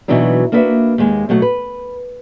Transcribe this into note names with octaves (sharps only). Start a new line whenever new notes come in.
B2 E3 F#3 B3 D4 D#4
A#3 D4 F#4 B4 D#5 E5
D#2 G#3
B2 F#3 A3 F#5
B4